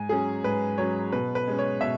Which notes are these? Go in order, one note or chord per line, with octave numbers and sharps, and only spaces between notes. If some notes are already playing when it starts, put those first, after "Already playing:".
Already playing: G#2 G#5
F#3 C#4 G#4
G#2 B4
F#3 C#4 C#5
B2 B4
B4
G#3 C#4
C#5
B2 E5